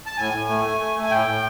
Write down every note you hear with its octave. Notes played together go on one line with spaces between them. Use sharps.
A5
A2 G#5
A2
A3
A3
A3
A3
G#5
A2 G5
A2